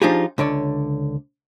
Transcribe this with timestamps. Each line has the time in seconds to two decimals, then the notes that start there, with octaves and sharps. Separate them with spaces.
0.02 F3 D4 D#4 F4 G4 G#4
0.38 C#2 D3 C#5 D5